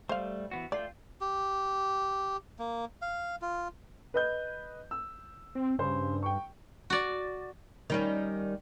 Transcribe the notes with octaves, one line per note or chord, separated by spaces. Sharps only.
G3 A3 C5 F5
E3 B3 F#4
A3 F4 D5 G5
G4
A#3
F5
F4
B4 D#5 G6
E6
C4
G2 C#3 C5
G5 C#6
F#4 D5
D#3 G3 C#4